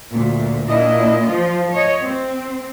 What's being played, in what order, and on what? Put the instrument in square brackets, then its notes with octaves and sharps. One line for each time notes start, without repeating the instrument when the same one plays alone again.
[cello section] D2 A#2
A#2 D4 E4 D#5
F3 F4
C#5 D#5
C4